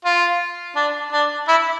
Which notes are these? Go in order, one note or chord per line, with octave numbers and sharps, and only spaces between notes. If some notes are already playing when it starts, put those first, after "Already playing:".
F4
D4
D4
E4